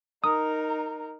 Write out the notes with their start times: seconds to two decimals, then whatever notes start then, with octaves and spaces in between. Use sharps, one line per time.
0.24 D#4 A#4 D#6